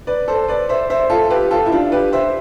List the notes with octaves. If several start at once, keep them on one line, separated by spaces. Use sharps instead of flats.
B4 D5
A4 C5
B4 D5
C5 E5
C5 E5
F4 A4
G4 B4
F4 A4
E4
D4 F4
G4 B4
C5 E5